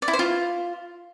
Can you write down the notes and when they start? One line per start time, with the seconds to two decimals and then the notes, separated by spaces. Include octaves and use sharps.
0.02 D5
0.08 E4
0.13 C5
0.19 F4